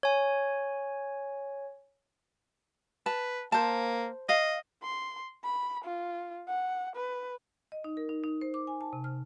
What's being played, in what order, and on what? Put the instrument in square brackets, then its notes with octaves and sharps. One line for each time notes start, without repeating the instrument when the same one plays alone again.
[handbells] C#5 G#5
[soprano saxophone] B4 [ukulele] A5
[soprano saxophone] A#3 [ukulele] C5 A5
[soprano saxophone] D#5 [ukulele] F5
[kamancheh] C6
B5
F4
F#5
B4
[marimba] D#5
D#4
A#4
D#4
D#4
C5
D6
G#5
A5
C3
F6